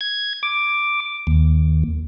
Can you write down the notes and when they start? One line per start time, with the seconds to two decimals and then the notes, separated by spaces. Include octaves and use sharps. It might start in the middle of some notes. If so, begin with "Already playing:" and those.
0.01 G#6
0.43 D6
1.27 D#2